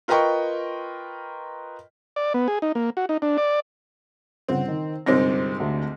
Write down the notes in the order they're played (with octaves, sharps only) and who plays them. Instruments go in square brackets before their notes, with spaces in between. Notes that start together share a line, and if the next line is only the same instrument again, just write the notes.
[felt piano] F4 A#4 B4 D#5 G5 C#6
[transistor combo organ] D5
B3
G#4
D#4
A#3
F#4
D#4
D4
D5
[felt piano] G1 C#3 F#5 [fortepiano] C4
[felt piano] D#3
[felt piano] G1 C5 A#6 [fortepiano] C2 G#2 C3
[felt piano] D2 D3